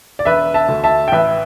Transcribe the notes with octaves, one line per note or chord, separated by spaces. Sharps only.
D5
E1 B4 E5
E5 A5
D2 D3 A3
E5 A5
G5
A1 B4 E5